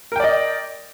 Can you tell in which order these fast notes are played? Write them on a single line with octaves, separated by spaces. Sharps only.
A#4 G5 D5 D#5